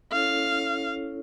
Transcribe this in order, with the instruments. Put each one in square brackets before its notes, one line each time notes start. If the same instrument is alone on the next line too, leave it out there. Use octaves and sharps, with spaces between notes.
[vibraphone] C#4 E4 A4 C#5 [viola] F5